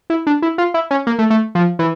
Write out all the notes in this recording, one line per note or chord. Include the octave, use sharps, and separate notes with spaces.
E4
D4
E4
F4
E4
C#4
A#3
A3
A3
F3
E3